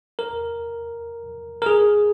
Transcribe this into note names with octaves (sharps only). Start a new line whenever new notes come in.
A#4
A#4
G#4